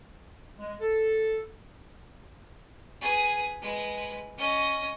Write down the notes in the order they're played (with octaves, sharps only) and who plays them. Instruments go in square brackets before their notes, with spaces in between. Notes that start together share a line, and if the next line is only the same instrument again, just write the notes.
[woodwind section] G#3
A4
[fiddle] G#4 B4
G#3 B4
C#4 D#5